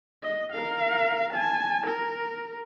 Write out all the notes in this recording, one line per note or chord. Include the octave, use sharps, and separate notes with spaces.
D#5
A#4 F5
G#5 A5
A#4